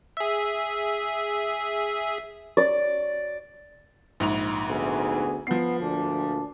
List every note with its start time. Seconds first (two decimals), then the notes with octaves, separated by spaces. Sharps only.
0.17 G#4 E5
2.57 D5
4.20 A#1 G#2 F7
4.68 D2 B3 G#4
5.47 F3 B3 C7
5.81 D2 A#2 D4